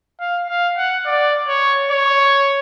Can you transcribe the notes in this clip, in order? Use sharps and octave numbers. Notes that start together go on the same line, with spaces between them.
F5
F5
F#5
D5
C#5
C#5